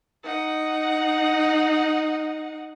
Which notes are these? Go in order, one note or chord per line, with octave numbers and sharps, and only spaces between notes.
D#4 F#5